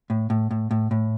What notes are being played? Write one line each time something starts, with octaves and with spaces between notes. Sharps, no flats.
A2
A2
A2
A2
A2